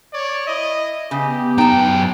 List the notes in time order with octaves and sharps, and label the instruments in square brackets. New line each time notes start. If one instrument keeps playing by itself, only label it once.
[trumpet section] C#5 D5
E4 D#5
[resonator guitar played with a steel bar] C#3 [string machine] B3 [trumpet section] G4
[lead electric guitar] F#2 G5 [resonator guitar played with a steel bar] D#4 A5